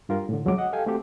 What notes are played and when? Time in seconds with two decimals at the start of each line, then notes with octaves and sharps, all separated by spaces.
0.09 G2 D4 F4 G4 A#4
0.29 A2 D3
0.45 C2 F2 F#3 G#3 C#4 D6
0.58 D#5 F#5
0.72 G4 A4 F5 G5 G#5
0.86 A3 C4 F#4 G4 A4